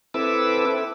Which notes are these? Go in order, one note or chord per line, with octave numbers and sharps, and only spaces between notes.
C4 E4 A4 B4 D6 E6